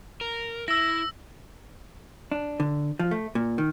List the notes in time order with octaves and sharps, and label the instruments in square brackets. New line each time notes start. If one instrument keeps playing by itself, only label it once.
[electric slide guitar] A#4
[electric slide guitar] E4 [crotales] E6 A#6
[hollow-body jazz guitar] D4
D3
F3
A3
A#2
D#3